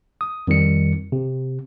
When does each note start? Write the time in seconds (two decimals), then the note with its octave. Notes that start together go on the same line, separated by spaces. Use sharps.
0.21 D#6
0.48 F2 D#3 G3 C#7
1.12 C3